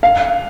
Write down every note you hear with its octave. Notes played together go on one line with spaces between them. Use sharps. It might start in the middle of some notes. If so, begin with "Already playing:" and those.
F5